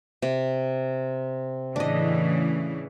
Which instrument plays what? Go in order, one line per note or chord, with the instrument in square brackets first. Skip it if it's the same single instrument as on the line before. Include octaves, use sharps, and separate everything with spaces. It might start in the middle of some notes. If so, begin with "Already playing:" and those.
[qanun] C3
[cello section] A2 C#3 E3 [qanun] D4 D#5